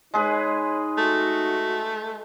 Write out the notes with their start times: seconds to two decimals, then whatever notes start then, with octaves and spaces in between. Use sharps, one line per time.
0.14 G#3 D#4 G#4 B4 C#5
0.97 A3 F#4